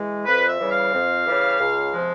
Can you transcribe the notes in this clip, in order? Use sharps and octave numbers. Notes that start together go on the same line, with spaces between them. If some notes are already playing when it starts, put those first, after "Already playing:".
Already playing: E3 G#3
F2 B4
E5
C#3 E3 G3
F5
F2
C#3 E3 G3
C#2
C3 F3 G#3